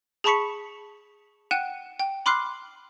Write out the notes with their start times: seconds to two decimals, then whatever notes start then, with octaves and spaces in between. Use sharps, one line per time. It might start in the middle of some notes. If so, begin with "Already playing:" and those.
0.24 G#4 A5 B5 C#6 B6 C#7
1.51 F#5 G5 F#6 D#7 E7
2.00 G5
2.26 B5 C6 D6 F6 F#6 C7